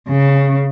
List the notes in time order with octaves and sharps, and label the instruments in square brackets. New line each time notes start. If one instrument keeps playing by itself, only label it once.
[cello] C#3